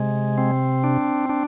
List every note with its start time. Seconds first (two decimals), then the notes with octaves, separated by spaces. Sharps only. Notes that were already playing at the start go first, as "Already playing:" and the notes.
Already playing: C3 G#3
0.38 C4
0.84 D4
1.29 D4